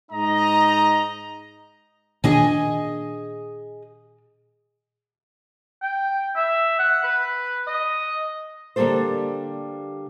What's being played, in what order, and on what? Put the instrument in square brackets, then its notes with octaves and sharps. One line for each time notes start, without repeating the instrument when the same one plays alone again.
[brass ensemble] G#2 D#4 D#5 A#5
[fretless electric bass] A#2 D#3 D4 [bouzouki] G#4 D#5 G#5
[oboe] G5
E5
F#5
B4
D#5
[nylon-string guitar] D3 G3 A#3 G4 A4 C5